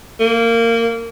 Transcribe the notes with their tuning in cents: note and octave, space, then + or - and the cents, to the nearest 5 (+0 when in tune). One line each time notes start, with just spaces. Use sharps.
A#3 -20